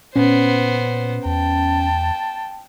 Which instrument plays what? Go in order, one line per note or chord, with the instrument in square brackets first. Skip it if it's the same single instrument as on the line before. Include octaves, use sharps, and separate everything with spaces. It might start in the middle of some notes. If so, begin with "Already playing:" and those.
[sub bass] A#2 [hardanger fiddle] B3 C5 [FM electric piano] C#4
[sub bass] E2 [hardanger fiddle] G5 [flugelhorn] A5